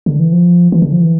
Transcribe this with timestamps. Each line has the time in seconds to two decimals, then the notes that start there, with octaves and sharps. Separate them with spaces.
0.06 D3
0.20 E3
0.32 F3
0.72 E3
0.82 D3
0.93 F3
1.02 E3